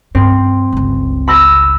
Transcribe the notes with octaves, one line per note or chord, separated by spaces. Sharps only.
G2 C4
G1 C#2
B5 E6 A#6